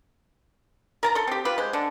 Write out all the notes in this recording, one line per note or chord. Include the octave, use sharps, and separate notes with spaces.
A#4 A5 A#5
A4 C6
C4 G4
F4 G4 B4
G#3 C5
D3 D4